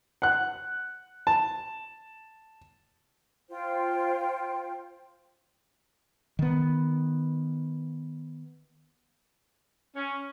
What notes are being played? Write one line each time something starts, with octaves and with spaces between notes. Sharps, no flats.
F#5 F#6
A5
F4 C5 G5
D#3 B3
C#4